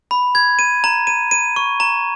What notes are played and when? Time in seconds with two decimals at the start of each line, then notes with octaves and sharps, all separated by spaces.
0.11 B5
0.35 G#6
0.59 D#7
0.84 A#5
1.07 D#7
1.31 D#7
1.56 C#6
1.80 A#5